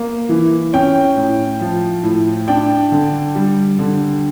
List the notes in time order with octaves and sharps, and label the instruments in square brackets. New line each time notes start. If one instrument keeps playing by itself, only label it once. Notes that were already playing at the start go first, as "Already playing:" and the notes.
Already playing: [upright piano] A#3
E3
C#4 G5
A2
F3
A2
D4 G5
D3
G3
D3